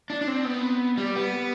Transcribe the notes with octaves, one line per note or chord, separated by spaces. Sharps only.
D4
D4
C4
B3
G3
B3